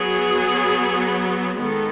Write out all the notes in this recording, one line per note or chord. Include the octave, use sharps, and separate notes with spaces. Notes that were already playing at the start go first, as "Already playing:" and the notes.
Already playing: F#3 B3 G#4
D#3 G#3 B3 A4